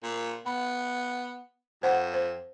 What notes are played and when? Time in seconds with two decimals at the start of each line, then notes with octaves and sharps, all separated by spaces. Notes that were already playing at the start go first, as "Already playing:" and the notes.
0.03 A#2
0.46 B3 B5
1.83 F2 C5 F#5
2.14 C5